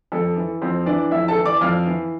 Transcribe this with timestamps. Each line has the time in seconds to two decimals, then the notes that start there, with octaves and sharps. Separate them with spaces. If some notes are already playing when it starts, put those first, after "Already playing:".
0.12 F2 A4
0.36 E3
0.62 F2 C4 C5
0.86 E3 D4 D5
1.11 F2 E4 E5
1.28 A4 A5
1.37 E3
1.45 D5 D6
1.61 F2 F5 F6
1.86 E3